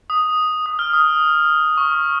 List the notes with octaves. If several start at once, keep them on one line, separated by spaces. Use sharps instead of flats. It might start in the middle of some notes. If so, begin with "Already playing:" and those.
D#6
D#6
F6
D#6
C#6